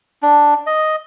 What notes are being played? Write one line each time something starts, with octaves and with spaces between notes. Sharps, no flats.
D4
D#5